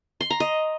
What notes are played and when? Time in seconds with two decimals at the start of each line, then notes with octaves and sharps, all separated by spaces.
0.21 C6
0.30 A#5
0.40 D#5